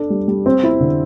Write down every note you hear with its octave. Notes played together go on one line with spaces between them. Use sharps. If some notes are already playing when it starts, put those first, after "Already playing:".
Already playing: D4 A4
G3
G3
C4
E4
D3